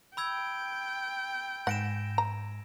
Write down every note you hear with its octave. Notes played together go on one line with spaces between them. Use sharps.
G5 B5 E6 G#6
G#2 F#5 A#6 D7 E7
A#5